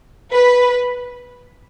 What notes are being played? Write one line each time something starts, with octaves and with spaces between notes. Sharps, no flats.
B4